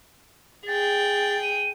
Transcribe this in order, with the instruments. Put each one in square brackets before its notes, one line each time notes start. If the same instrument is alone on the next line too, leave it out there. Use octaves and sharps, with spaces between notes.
[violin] G#4 G5 [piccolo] A6
[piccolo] D#7